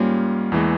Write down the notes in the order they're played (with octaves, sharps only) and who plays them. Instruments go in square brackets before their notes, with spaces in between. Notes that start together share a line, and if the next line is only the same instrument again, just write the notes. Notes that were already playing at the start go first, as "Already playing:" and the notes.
Already playing: [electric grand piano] G#2 G3 C#4 F4 [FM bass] A#3
[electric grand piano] E2 E3 G#3